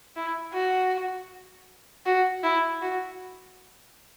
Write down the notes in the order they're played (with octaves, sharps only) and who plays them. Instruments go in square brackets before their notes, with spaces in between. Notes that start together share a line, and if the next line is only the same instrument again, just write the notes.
[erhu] E4
F#4
F#4
E4
F#4